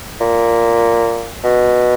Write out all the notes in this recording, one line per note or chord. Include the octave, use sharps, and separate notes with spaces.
A#2
B2